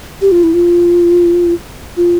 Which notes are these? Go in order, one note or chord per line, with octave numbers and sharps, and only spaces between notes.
G4
F4
E4
F4
F4